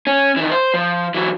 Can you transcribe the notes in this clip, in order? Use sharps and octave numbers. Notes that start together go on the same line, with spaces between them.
C#4
D#3 E3
C5
F3
E3 F#3